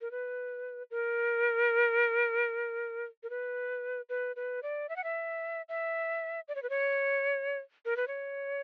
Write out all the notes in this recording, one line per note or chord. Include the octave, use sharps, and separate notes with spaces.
A#4
B4
A#4
A#4
B4
B4
B4
D5
E5
F#5
E5
E5
D5
C#5
B4
C#5
A#4
B4
C#5